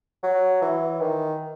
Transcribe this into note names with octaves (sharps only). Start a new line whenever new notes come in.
F#3
E3
D#3